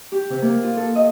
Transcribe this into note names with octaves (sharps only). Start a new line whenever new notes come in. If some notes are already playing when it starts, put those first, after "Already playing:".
G4
C3
A#3
F4
A4
D#5